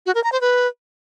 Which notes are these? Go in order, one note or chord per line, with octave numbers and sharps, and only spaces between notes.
F#4
A#4
A#5
C5
B4